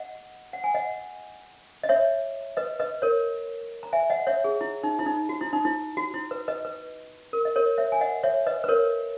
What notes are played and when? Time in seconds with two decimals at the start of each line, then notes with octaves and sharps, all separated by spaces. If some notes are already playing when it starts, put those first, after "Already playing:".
Already playing: D#5 F#5
0.53 F#5
0.64 G#5
0.75 D#5 F#5
1.83 D#5
1.89 C#5 E5
2.57 B4 D#5
2.80 B4 D#5
3.02 A#4 C#5
3.83 A#5
3.93 E5 G#5
4.10 D#5 F#5
4.27 C#5 E5
4.44 G#4
4.61 E4
4.84 D#4
4.99 E4
5.06 D#4
5.29 F#4
5.41 E4
5.53 D#4
5.65 E4
5.97 F#4
6.14 E4
6.31 B4
6.48 B4 D#5
6.65 B4
7.33 A#4
7.45 D#5
7.56 A#4 C#5
7.78 C#5 E5
7.92 G#5
8.01 D#5 F#5
8.23 C#5 E5
8.47 B4 D#5
8.64 B4
8.68 A#4 C#5